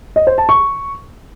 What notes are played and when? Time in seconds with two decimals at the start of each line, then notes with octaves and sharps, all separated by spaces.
0.16 D#5
0.27 C5
0.38 A5
0.49 C#6